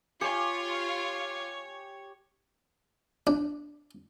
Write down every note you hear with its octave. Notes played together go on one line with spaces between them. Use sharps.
F4 G4 C#5 G5 G#5 C#6 C#7
D4